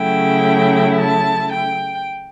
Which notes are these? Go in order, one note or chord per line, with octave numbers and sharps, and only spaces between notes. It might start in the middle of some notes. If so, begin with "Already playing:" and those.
Already playing: C#3 F#3 A3 E4 G5
A5
G5